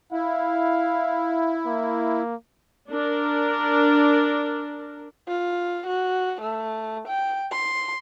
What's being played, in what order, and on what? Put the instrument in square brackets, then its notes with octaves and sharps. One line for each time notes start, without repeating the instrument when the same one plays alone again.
[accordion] E4 [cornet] F5
[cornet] A#3
[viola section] D4 A#4
[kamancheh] F4
F#4
A3
G5
C6